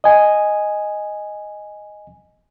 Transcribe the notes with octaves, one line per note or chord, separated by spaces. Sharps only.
D#5 G#5